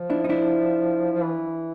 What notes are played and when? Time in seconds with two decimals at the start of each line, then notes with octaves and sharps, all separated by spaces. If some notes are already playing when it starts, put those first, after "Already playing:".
Already playing: F3
0.10 D4 E4
0.24 D#4
0.29 D4 E4
1.12 F3
1.23 E3